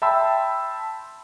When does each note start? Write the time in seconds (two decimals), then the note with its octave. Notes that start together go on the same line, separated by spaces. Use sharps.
0.02 E5 G5 A5 B5 C6 E6